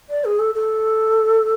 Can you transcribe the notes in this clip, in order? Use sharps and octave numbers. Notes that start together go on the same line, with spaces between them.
D5
G#4
A4
A4